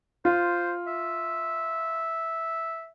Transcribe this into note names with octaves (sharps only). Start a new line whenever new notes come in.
F4 C5
E5